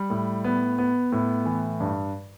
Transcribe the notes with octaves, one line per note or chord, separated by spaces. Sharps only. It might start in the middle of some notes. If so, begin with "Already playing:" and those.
Already playing: G3
A2
B3
B3
A2
E3
G2